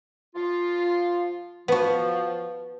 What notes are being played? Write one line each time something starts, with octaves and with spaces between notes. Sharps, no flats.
F3 F4
F3 B3 F#4